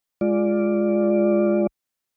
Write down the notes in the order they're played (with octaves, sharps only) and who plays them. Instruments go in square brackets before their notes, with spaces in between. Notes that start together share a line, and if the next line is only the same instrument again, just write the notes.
[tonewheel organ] G#3 F4 D5